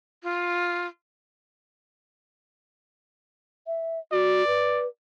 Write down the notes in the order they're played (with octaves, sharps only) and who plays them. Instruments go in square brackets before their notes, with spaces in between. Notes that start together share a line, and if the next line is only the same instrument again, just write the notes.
[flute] F4
[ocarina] E5
[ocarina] F#4 [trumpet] D5
[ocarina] B4